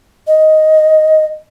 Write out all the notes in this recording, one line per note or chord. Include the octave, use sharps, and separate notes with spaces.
D#5